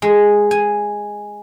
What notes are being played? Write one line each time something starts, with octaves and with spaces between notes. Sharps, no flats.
G#3
G#5